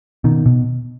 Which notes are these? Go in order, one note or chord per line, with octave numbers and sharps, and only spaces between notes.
B2 D#3
B2